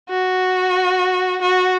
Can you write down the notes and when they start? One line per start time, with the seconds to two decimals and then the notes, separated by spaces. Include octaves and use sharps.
0.10 F#4
1.41 F#4